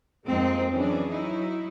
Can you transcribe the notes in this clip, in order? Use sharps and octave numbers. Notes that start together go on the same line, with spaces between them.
F2 G#3 A#3 C4 D#4
E3 F#3 C#4 D4 G#4
F#3 D#4 E4